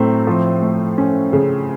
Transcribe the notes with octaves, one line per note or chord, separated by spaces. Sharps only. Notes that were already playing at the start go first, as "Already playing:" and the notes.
Already playing: A2 F#3 A3 C4
F3
A3
C#4
C#3